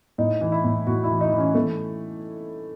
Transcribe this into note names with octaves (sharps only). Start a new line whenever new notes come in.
A2 D#4
E3
E4
A2
A2 F#4
E4
E3
D#4
E3
C#4
E3 A3